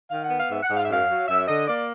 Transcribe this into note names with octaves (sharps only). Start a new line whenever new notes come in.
D#3 F5
F#5
B3
F5
G#2 E5
F#5
G#2
F5
E5
F#2 F5
F#3
F#2 E5
D3 D#5
A#3 D5